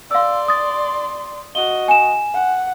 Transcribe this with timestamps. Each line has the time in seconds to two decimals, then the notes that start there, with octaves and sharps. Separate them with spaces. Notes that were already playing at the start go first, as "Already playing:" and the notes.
0.11 D5 F5 C6 E6
0.48 D#6 A6
1.55 F#4 D#5 G7
1.88 G#5 E7
2.33 F#5